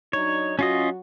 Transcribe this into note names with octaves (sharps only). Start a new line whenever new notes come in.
F#3 D4 D#4 C#5
F#3 C#4 F4 F#4 D#5